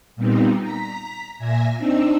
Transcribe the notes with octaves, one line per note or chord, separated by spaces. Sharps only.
A#2 G3 B3 C4 D#4
A#5 B6
A#2 E5 G#5 A#6
C4 D4 D#4 E6